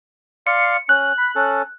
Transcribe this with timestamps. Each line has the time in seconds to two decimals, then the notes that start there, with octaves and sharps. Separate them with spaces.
0.47 D5 F5 C6 C#7
0.89 C#4 F#6
1.18 B5
1.35 C#4 A4